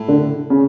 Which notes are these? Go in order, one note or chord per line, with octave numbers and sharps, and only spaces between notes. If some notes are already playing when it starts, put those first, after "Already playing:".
Already playing: A2
D3
C#3